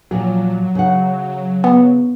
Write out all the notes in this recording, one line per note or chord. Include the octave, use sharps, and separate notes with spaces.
A#2 F3 F#3
C#3 F#5
B3